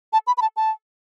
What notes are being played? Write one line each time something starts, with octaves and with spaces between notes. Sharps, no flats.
A5
B5
B5
A5
A5